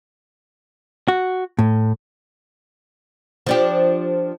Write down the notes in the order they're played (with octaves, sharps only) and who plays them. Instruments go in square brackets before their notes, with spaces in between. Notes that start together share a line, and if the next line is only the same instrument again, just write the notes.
[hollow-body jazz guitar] F#4
A2
[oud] F3 D4 G4